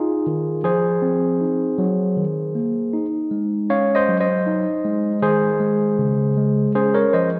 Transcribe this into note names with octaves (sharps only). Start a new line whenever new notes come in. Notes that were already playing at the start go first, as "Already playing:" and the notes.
Already playing: D#4 F4 G#4
D#3
F3 G#4 C5
C4
D#4
F#3
D#3
A#3
D#4
G#3
C#4 C#5 F5
C5 D#5
F#3
C5 D#5
D#4
G#3
D#3 G#4 C5
G#3
C#3
G#3
C#4 G#4 C5
A#4 C#5
F3 C5 D#5